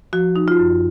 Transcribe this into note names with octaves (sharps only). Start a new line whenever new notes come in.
F3 F#4
D#4
F4
F#2